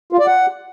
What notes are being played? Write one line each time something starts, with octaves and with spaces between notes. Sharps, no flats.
F4
D5
F#5